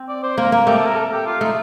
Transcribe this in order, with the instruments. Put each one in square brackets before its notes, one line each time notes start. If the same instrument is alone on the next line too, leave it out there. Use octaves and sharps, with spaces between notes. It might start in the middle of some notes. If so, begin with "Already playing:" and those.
Already playing: [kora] C4
[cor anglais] D5
C5
[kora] A#3 [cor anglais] A#4
[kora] A#3 [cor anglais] A#4
[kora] A3 [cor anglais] G4
[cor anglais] A4
A#4
A4
G4
F4
[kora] A3 [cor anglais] D#4